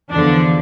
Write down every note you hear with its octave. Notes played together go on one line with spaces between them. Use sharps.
E2 D3 F3 D4